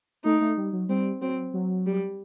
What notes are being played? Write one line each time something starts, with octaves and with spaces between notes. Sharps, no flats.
A3 D#4
A3
G3
F#3
G3 C4
F#3 C4
F#3
G3